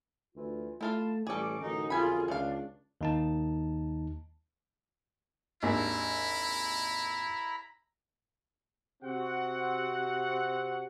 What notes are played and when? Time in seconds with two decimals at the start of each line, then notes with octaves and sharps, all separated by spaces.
0.35 D2 E3 F4
0.81 A3 E4 F4 F5 A5
1.27 A1 C#3 G3 G#4 A4 C#6 D6
1.61 A1 F#2 D3 D#4
1.90 F2 C4 F4 G#4 G#5 B5
2.28 C#2 A3 D4 F5
3.01 D#2 D#4 A5
5.63 G#1 D#2 D4 E4 A#5 B5
9.03 C3 C4 F#4 F#5